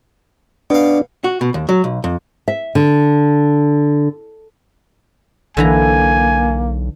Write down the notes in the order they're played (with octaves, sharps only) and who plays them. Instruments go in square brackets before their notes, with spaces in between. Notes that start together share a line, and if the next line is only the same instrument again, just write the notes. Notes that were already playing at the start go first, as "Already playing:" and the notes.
[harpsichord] B2 F5 [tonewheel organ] D4
[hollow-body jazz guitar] F#4
B2
D#2
F#3
B1
F2
[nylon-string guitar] E5
D3
[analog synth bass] B1 [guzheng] D3 E3 A#5 [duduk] A#3 [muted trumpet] G#5